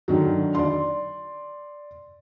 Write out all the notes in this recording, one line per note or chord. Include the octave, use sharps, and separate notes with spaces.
D3 D#3 F#3
D5 C6